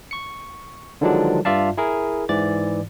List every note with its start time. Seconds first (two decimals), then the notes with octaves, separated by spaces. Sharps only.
0.11 C#6 C#7
1.01 D3 D#3 F3 F#3 G#3 D4
1.45 G2 F4 D5 E5 F5 A5
1.77 E4 G#4 A#4
2.29 G#2 E3 D5 A6